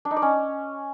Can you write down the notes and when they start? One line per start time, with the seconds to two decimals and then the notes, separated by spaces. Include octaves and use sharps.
0.05 D4
0.11 D#4
0.16 D5
0.22 C#4